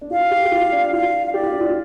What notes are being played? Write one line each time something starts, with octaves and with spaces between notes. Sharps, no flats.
D4
F4 F5
G4
G4
F4
D4
F4 F5
F5
G4 D5
F4
D4
F4